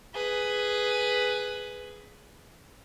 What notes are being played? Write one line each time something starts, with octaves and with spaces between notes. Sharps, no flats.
G#4 B4